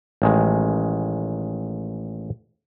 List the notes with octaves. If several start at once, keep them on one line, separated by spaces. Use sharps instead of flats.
A1 D#3 G#3